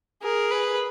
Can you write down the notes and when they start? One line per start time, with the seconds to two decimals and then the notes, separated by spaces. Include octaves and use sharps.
0.22 G#4 A#4
0.51 B4